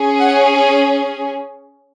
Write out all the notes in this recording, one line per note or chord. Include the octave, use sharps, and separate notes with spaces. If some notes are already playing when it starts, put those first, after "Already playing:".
Already playing: C#4 G#4
F#5